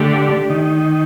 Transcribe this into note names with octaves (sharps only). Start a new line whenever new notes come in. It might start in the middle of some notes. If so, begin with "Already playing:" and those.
Already playing: D3 A3 D4 G4 D5
D#3